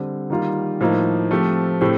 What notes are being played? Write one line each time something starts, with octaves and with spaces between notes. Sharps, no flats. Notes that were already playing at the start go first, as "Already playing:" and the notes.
Already playing: D3 G3 C4
D#3 G3 A#3 F4
A2 F3 A#3 D#4
F3 A3 C4 G4
A2 A3 C4 G4